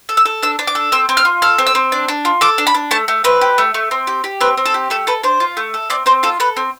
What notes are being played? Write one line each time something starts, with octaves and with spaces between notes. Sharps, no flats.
A4
E6
A4
D4 E6
D4
D6
A4
C4 E6
C4
F6
F4
A4 F6
C4
E6
C4
D4
D4
F4
A4 D6
D4
B5
D4
A3 A5
A3
C4 B4
G4
A3
A3
C4
G4
G4
C4 B4
C4
A4
G4
A3 A4
A4 B4
D4 C5
F4
A3
A4
C4 D5
C4 C5
F4 A4
A4 B4
C4